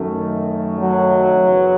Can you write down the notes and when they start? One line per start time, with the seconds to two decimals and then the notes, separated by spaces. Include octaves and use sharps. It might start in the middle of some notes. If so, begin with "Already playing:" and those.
Already playing: F#2 D#3 A3
0.80 F#3
1.38 F#2 C#3 E3 B3